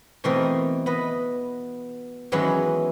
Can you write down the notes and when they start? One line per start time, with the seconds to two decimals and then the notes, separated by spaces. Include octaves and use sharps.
0.24 B2 E3 A3 C4 D#4 A#4
0.86 B3 B4 D#5
2.32 D#3 E3 F#3 G#3 B3 C#4